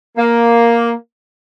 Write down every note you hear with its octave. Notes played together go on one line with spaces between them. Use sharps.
A#3